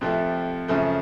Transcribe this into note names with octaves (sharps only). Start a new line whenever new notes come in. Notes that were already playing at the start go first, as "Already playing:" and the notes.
F2 C3 F3 A3
F#2 C#3 F3 A3